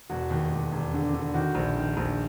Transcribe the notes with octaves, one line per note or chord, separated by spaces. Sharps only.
E1 F#4
D#2
E1
E1
D3
D3
D#3 F#4
A#1
D#3
A#1